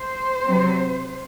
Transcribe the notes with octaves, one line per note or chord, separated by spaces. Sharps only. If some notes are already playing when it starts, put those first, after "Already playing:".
Already playing: C5
C3 F#3 C4